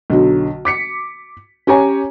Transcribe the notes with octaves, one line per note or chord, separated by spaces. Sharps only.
B1 D3 F#3
D6 B6 C#7
C#4 G4 C#5 G#5 A#5